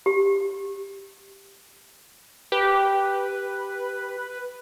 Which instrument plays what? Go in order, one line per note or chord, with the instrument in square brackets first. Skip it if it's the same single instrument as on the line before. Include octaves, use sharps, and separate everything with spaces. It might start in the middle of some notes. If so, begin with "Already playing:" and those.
[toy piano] G4
[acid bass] G4 [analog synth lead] B4